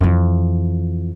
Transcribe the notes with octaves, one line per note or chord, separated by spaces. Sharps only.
F2 E3